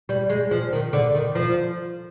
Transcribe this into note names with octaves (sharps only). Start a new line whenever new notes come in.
G3
G#3
F3
D#3
D3
D#3
F3